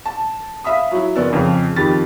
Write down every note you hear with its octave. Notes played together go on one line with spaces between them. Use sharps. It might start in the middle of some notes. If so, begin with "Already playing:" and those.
A5
E5 F5 B5 D#6
F#3 E4
F#1 B3 D5 E6
F2 C#3 F3
F2 D#3 G4 B5 A6